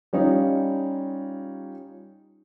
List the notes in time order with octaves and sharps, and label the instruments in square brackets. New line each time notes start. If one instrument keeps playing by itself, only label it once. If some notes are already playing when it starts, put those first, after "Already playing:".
[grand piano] G3 C#4 D#4 F4